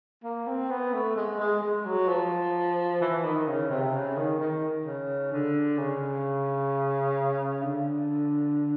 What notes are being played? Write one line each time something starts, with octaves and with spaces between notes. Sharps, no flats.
A#3
C4
B3
A3
G#3
G#3
G#3
F#3
F3
E3
D#3
C#3
C3
C#3
D#3
D#3
C#3
D3
C#3
D3